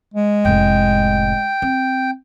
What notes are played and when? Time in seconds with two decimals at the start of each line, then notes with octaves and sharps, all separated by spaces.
0.14 G#3
0.45 F1 A2 G5
1.62 C4